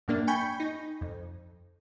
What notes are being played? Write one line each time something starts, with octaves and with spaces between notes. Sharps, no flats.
F#2 A2 A#3 D4
G5 G#5 B5 C#6 G6
D#4
F2